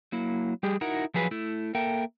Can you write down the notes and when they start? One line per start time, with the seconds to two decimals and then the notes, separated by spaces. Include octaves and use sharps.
0.12 F#3 A#3 E4
0.63 G3 G4 G#4
0.81 D#4 E4 F#4 A#4
1.14 F3 F#3 G#4 B4
1.31 A3 E4
1.75 A#3 A4 A#4 E5 G5